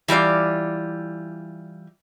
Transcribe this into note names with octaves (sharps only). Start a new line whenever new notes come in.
E3 G3 F4 D5